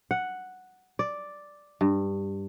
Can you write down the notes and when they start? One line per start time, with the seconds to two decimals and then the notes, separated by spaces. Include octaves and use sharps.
0.11 F#5
0.99 D5
1.81 G2